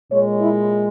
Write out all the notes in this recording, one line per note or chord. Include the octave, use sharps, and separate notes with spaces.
A#2 G#3 C#5
E4